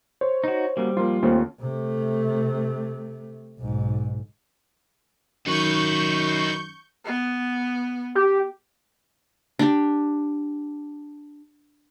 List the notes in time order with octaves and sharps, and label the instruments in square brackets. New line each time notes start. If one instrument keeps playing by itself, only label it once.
[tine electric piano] C5 [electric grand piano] C#5
[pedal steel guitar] D#4 F#4
[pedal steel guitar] G3 [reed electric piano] A#3 C#4 F#4
[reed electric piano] F3 A#3 [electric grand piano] F4
[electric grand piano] D#2 [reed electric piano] A3 C#4 G4 [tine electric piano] A#3 C4 F4
[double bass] C3 A3
B1 G#2
[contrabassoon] F#2 [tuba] D#3 [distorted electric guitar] D#4 B4 [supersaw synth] C#6 G6
[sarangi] B3
[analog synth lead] G4
[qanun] D4 G4